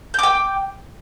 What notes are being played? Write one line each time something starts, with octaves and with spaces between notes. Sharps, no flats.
G5 D6 G6